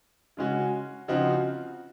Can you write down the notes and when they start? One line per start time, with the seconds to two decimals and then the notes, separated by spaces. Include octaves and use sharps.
0.37 C#3 G#3 C#4 F#4
1.08 C#3 F3 C4 D#4 F#4